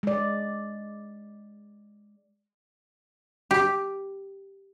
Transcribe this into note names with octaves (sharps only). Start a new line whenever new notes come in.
G#3 D5
G4